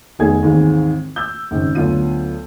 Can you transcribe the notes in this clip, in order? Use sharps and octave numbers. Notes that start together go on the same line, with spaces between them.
F1 D#3 B3 F#4 G#4 G#6
D#2 G#2 E3 G#3 C4
E6 G6
G#1 C#3
D2 F#3 B3 F4 D#7